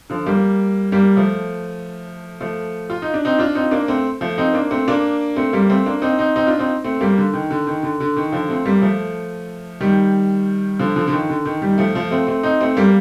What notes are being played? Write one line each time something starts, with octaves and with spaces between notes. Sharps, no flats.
D3 F3
G3 A#3
G3 A#3
F3 A3
F3 A3
F4
D#4
D4
C4 D#4
D4 F4
C4 D#4
A#3 D4
A3 C4
F3 A3
C4 D#4
A#3 D4
A3 C4
A#3 D4
A3 C4
G3 A#3
A3 C4
A#3 D4
C4 D#4
C4 D#4
C4 D#4
D4 F4
C4 D#4
A3 C4
G3 A#3
D3
D#3
D3
D#3
D3
D3
D#3
D3 F3
A3 C4
G3 A#3
F3 A3
D#3 G3
D3 F3
D3 F3
D3
D#3
D3
D#3
D#3 G3
F3 A3
F3 A3
A3 C4
A3 C4
C4 D#4
A3 C4
G3 A#3